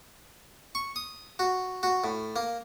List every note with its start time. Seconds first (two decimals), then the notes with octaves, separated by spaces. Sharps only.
0.75 C#6
0.96 D#6
1.39 F#4
1.83 F#4
2.04 A2
2.36 A#3